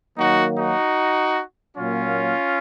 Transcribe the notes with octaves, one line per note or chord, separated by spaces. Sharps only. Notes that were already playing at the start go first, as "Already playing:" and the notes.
D#3 F#3 A#3 D#4 F#4
D#4 F#4
A#2 F#3 A#3 C#4 F4